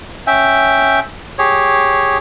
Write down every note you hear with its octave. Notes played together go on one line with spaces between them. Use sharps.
C#4 E5 G5
G4 G#4 C#5